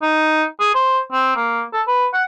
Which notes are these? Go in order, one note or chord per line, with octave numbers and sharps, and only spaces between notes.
D#4
G#4
C5
C4
A#3
A4
B4
F#5